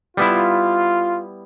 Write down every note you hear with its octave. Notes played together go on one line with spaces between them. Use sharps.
G3 B3 E4 F4